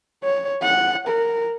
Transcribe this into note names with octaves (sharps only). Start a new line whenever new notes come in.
C#5
F#5
A#4